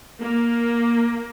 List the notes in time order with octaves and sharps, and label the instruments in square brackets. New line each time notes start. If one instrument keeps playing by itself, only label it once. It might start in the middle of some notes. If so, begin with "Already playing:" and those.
[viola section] A#3